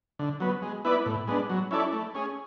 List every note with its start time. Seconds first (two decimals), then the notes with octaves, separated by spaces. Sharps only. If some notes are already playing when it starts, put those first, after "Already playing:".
0.19 D3
0.40 F#3 B3
0.62 G#3
0.85 B3 E4 B4 D5
1.06 A2
1.27 G#3 B3 D4
1.50 F#3
1.71 C#4 E4 A4 D5
1.93 A3
2.15 C#4 G#4